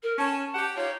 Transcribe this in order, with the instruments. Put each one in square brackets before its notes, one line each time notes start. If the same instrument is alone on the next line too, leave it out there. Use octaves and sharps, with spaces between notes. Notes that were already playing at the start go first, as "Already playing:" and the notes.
[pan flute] A#4
[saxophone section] C#4 [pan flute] A5
[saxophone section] G4 F#5
[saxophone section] D#4 F4 G4 [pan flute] C#5